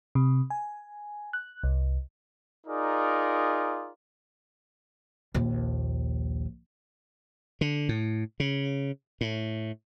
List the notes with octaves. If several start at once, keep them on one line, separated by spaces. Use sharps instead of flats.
C3
G#5
F#6
C2
D#4 F4 G#4 A#4 D5
A#1 D#2
D3
A2
C#3
A2